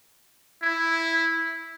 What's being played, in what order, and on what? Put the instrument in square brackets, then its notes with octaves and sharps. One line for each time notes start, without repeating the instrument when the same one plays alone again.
[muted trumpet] E4